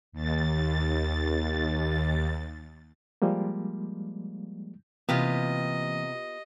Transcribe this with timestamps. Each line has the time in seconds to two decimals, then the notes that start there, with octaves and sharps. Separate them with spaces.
0.12 D#2 A6
3.22 F3 G3 G#3 A#3
5.09 C3 E3 A#3 B3 F4 G4 D#5